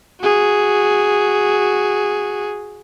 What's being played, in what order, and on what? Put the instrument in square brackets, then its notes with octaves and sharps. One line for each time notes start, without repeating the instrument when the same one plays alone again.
[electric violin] F#4 G#4